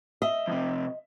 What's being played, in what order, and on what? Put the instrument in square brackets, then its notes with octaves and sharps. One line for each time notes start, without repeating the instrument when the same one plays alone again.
[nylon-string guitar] D#5 [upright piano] E5
[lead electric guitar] F2 C3